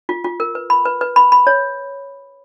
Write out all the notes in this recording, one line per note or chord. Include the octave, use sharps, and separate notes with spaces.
F4
F4
A#4
B4
B5
B4
B4
B5
B5
C#5